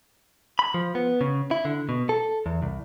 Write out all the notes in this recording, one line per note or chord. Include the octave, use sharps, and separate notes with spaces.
B5
F3
B3
C#3
E4
D3
B2
A4
E2
C2